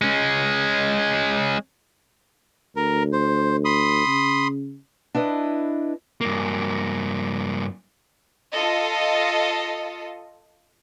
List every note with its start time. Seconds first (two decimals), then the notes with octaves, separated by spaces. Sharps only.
0.02 G#3 C#4
2.76 D2 A#4
3.13 C5
3.65 B5 C6 D#6
4.07 C#3
5.14 D4 E4 B4 D#5
6.21 G2 A#3
8.51 F4 A4 D#5